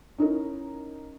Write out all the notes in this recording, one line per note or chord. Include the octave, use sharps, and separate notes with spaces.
C#4 D#4 E4 A#4